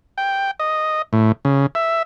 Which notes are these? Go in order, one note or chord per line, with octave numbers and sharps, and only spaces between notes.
G5
D#5
A2
C#3
E5